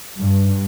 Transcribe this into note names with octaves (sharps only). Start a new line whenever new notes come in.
G2